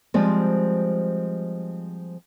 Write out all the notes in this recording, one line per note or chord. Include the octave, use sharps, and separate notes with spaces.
F3 G3 G#3 C4